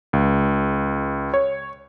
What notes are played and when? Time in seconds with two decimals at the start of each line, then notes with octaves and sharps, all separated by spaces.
0.13 C#2
1.34 C#5